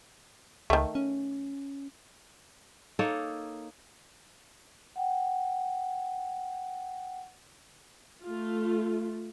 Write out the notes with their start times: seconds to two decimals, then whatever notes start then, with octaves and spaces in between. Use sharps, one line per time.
0.70 C#2 D#3 A3
0.95 C#4
2.99 A#3 D#4 A4 C#5
4.96 F#5 G5
8.24 A3 F4